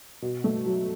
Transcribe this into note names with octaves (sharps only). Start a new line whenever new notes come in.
B2
A3
F#3